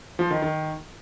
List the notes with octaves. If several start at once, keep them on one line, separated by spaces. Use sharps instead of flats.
F3
D#3
D#3